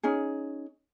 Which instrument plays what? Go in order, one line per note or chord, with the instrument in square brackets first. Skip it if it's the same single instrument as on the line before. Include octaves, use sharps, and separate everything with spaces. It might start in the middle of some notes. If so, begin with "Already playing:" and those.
[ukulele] C#4 D#4 G#4